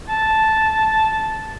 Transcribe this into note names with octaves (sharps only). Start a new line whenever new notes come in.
A5